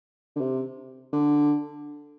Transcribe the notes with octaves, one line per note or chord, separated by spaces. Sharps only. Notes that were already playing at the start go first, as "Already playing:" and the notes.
D3
C3
D3